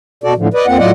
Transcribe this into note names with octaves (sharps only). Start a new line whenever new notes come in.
B2 F#4 A4 D5
A2 D3 F3
B4 D5 D#5
F2 A#3 C4 F4 F#5
A2 F#3 F4 D5 D#5 F#5